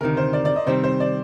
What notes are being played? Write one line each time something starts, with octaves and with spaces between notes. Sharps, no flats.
D2 C3 D#3 A#4
C5
D5
D5
D#5
C3 D#3 G3 C4 C5
C5
D5